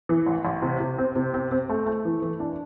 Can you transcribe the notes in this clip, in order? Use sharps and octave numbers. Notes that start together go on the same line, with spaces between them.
E3
A1
A1
C3
C3
C4
C3
C4
C4
A3
A3
E3
E3
D4